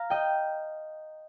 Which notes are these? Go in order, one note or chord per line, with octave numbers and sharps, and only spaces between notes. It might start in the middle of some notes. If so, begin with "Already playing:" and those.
Already playing: F5 A#5
D#5 G5